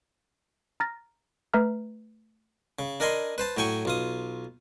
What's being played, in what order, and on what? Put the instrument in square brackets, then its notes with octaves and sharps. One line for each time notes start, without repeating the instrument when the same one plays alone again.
[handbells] A#5 F6 A6 A#6
A3 B4 E5 A#5 F6
[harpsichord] C#3
D4 A#4 D#5 G#5 B5 C6
B4 C5 A5
A2 F#3 G5 G#5 C#6
B1 F4 D#6